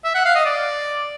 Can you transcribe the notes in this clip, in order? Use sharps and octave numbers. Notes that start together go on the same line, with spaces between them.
E5
F#5
F5
D#5
D5